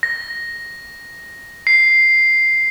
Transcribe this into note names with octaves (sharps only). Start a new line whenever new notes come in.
A#6
C7